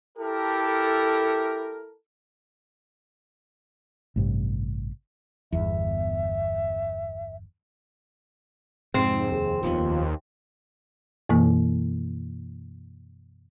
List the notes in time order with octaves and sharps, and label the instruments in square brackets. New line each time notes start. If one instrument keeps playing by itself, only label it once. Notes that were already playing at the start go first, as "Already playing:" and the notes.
[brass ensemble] E4 A4 A#4 [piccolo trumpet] G4
[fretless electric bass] A1 G2 C3
[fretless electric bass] G1 E2 [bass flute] E5
[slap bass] F2 C3 [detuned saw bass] G#2 [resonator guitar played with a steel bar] C4
[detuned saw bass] D#2 [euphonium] G#4
[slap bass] D#1 F2 B3 [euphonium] F4
[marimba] F#2 B2 E3 A#3